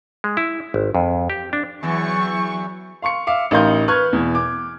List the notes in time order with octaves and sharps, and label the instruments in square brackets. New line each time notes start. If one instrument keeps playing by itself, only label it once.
[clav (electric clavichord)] G#3
E4
G#1
F2
G4
D4
[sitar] E2 E3 [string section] F#3 C#6
[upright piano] F5 C6 C#6 C#7
E5 F5 D6
A1 D#4 A#4 F5 C6 G6
B4 C#6 F6 F#6 G#6
E2 B2
D6